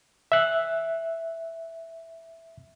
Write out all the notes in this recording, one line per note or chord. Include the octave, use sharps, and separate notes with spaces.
E5 F#6